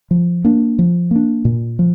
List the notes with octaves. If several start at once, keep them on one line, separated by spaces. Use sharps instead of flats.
F3
A#3 D4
F3
A#3 D4
A#2
F3